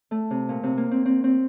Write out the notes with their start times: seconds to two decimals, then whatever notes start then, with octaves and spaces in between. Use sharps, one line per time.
0.11 A3
0.31 C3
0.49 A#2
0.63 C3
0.77 A#3
0.91 C4
1.06 C4
1.24 C4